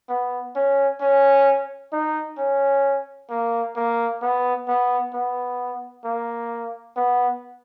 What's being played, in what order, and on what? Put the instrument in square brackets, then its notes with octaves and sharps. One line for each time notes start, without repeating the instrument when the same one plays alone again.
[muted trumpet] B3
C#4
C#4
D#4
C#4
A#3
A#3
B3
B3
B3
A#3
B3